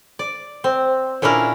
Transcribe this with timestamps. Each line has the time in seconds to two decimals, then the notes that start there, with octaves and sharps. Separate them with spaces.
0.19 D5
0.64 C4
1.22 A#2 C#4 D4 E4 A#4